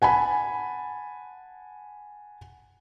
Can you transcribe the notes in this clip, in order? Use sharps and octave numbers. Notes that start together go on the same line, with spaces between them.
F#5 G#5 A5 B5